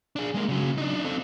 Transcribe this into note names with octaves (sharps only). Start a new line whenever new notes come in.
D4 G#4
G#3 A#3
C#3 F#3
D4 D#4
C4 A4